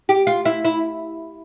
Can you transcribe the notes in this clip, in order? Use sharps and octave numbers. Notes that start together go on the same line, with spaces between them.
G4
F4
E4
E4